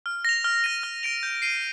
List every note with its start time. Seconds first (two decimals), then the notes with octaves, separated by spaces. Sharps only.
0.06 F6
0.25 A#6 F7
0.44 F6
0.64 A#6 D#7
0.83 F6
1.03 A#6 D7 F7
1.23 G6
1.42 C7 D#7 G7